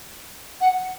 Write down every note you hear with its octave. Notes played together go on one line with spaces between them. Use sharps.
F#5